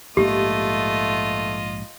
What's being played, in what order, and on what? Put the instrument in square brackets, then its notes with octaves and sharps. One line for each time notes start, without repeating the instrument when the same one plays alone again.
[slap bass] A#1 G#2 A#3 [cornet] A3 [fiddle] F4 D#5 [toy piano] G4